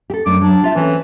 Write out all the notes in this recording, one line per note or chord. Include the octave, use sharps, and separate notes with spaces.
G4 A4
F#2 A3 D4 D6
F#3 D4 F#4
F4 E5 A5
E3 C4 C#4 A4